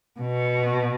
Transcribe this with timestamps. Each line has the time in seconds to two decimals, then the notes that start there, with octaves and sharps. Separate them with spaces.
0.20 B2